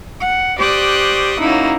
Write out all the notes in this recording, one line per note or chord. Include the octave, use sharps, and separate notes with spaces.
F#5
G4 C5 D5 C#6 D#6 F#6
F#3 A#3 C#4 D#4 E4